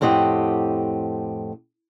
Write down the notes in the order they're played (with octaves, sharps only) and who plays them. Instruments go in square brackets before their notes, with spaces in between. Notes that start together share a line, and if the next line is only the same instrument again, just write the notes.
[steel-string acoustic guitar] F2 A2 C4 G4 D#5 F#5